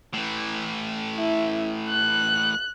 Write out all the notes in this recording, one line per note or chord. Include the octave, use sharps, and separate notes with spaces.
A2 E3
E4
F#6